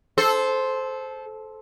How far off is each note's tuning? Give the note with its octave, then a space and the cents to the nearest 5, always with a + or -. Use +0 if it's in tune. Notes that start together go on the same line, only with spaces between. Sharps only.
A4 -20 C5 +0